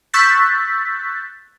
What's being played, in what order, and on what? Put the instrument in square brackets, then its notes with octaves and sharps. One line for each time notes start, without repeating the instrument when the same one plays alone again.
[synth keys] C#6 E6 F#6 G6 A6 B6